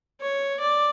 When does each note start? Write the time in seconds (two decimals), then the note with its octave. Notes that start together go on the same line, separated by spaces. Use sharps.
0.21 C#5
0.60 D5